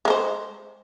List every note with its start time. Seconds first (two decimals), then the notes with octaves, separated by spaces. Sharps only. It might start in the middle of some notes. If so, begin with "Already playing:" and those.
0.05 G#3
0.08 A#4
0.10 C5